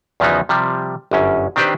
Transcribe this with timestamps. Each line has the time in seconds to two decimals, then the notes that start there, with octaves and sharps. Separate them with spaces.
0.20 E2 C#3 F3 F#3 B3 D#4
0.49 C3 F3 G3
1.11 G1 F#2 C#4
1.56 D#3 C4 D4 G4 B4 C5